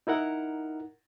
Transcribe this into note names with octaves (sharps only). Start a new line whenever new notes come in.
D#4 E4 A#4 F#5